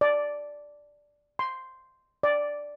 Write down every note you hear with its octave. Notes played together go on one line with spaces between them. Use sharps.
D5
C6
D5